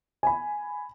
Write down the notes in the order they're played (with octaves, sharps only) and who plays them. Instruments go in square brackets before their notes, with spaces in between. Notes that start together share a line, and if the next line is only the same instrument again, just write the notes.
[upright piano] G#5 B5